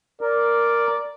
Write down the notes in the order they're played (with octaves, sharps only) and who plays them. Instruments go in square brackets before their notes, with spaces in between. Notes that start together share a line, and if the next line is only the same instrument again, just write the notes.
[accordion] A#4 [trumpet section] D5